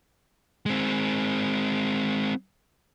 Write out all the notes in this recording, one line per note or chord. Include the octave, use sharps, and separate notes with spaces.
G#3 C4